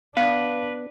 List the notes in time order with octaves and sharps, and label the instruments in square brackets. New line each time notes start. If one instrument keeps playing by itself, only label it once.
[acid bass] B3 [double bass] D4 [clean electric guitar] B4 [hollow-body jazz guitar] F5